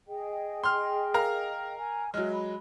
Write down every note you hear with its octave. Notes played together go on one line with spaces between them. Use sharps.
G#4 D#5 G5
C6 F6
A#4 F5 A#5
G#5
F#3 G#3 E5 F6
B5